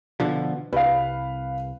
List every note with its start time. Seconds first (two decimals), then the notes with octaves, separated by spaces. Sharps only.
0.20 B2 D3 F3
0.73 C2 B4 F5